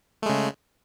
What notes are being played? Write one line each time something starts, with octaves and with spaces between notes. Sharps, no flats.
C#3 G#3 A3